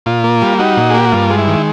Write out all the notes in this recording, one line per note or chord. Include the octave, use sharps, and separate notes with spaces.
A#2 F4
A#3
G3
D#4 F#4
A#2
G#4
A#3 G4
F#4
G2 F4
G#3
E4
D#3